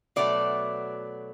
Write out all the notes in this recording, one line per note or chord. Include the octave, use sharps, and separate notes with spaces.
B2 F#3 A3 D5